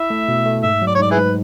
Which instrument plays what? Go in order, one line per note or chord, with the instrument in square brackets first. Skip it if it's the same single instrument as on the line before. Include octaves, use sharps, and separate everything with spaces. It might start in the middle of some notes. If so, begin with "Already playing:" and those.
Already playing: [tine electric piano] E4 [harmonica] E5
[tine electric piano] A3
B2
A3
[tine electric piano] G#2 [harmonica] E5
[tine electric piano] F#3
[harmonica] D5
C#5
[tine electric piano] G#2 [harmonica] D5
[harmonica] E4 G#4 B4
[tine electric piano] G#2